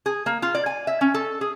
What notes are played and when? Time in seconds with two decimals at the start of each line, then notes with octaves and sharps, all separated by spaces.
0.06 G#4
0.26 A#3
0.42 F4
0.55 D5
0.66 G#5
0.87 E5
1.01 C#4
1.14 A4
1.41 G#4